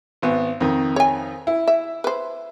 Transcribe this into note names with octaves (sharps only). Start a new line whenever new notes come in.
G#1 B3
F2 D#3
C#5 G#5
E4
E5
B4 C5